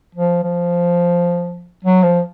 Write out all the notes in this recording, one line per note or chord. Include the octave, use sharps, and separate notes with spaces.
F3
F3
F#3
F3